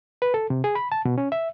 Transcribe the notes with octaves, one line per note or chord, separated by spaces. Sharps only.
B4
A4
C3
G#4
B5
A5
B2
C#4
E5